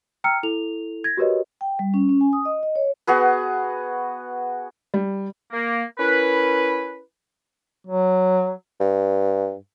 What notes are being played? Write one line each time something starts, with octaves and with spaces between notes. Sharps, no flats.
G5 A#5 E6 F6 C#7
E4 A4 F7
G#6 A#6
F#4 G4 A#4 B4 C#5 D#5
G5
G3
C#4
C#4
G#5
D#6
D#5
D#5
C#5
B3 F#4 G#4 B4
G3
A#3
C#4 E4 A#4 B4
F#3
G2